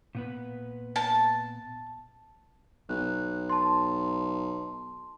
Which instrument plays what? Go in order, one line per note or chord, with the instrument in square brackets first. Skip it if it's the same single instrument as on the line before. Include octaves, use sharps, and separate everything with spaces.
[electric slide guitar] A#2 B3 B4
[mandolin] A5
[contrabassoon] B1 [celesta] F#6
[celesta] A5 C6